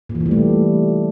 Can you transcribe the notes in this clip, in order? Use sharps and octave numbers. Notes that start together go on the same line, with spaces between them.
A#2
E3
C3
G3
A3